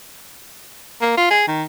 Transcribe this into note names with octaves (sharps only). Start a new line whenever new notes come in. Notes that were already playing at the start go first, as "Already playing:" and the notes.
A#3
F4
G#4
D#3